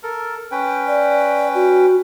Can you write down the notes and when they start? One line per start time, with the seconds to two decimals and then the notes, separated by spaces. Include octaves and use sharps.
0.03 A4 A#4
0.51 C#4 B4 G5
0.87 D5
1.55 F#4